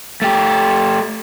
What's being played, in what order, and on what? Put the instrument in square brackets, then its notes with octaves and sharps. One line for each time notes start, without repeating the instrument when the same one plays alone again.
[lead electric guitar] A3 G4